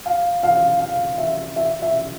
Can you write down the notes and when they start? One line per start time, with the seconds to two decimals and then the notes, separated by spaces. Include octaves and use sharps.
0.06 F5
0.43 F5
0.80 F5
1.18 E5
1.56 E5
1.82 E5